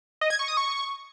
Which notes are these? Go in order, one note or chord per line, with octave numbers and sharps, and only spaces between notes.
D#5
G#6
C#6
D#6
C#6